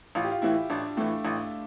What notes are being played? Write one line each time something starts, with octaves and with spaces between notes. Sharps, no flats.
A1 F4
G4
F4
A2 E3 E4
A1 D4
A2 E3 A3
A1